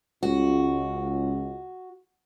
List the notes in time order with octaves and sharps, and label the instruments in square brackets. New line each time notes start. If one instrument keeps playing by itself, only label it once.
[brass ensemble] C#2 [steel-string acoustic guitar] F#4